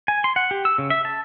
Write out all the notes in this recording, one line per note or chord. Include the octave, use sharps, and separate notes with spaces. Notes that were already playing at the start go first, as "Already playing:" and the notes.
G#5
C6
F#5
G4
E6
C#3
E5
A5